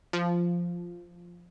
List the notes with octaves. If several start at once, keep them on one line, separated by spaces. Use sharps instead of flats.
F3